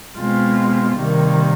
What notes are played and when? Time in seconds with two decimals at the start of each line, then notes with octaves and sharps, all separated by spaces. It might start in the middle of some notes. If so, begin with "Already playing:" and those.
0.18 B2 G#3 C4 F4
0.97 C3 D#3 G3 A#3